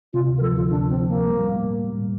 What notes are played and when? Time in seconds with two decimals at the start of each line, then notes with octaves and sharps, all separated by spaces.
0.13 C3 F4
0.28 D2
0.38 A#4
0.41 F3 A4
0.56 D2 F4
0.71 C3 D4
0.84 D2
0.90 C4
1.00 F3
1.08 D2 A#3
1.27 G3
1.42 A2
1.56 A#3
1.70 A2
1.85 G3
1.98 A2